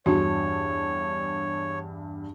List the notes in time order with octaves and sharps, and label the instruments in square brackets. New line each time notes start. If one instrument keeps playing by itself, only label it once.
[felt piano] E2 G2 [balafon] D4 F#4 [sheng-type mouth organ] C#5